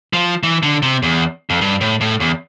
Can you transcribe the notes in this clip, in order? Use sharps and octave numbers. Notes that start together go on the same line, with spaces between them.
F3
E3
D3
C3
E2
F2
G2
A2
A2
E2